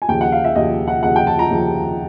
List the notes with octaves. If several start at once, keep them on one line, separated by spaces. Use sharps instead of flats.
G#5
D#2 C#3 F3 G5
F#5
F5
E5
D#2 C#3 F3 D#5
F#5
D#2 C#3 F3 F#5
G5
A5
A#5
D#2 C#3 F3